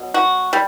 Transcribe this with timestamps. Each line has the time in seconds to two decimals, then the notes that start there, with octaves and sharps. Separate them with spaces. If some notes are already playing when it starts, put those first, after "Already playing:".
Already playing: B2 F#3
0.14 F#4
0.53 G3